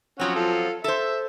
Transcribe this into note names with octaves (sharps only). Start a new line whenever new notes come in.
F3 F#3 C4 C#4 F#5
F4 A4
A4 C5 E5